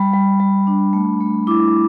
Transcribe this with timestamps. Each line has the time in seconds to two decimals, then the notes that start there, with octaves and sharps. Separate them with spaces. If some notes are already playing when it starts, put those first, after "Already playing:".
Already playing: G3 B5
0.13 G3
0.40 G3
0.67 D4
0.93 A3
1.20 A3
1.47 E4 D6